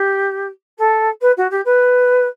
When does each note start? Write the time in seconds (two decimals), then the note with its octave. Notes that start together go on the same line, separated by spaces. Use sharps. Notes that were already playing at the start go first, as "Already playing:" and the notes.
Already playing: G4
0.78 A4
1.21 B4
1.37 F#4
1.50 G4
1.65 B4